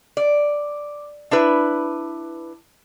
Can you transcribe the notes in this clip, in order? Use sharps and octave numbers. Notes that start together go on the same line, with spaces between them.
D5
D4 E4 B4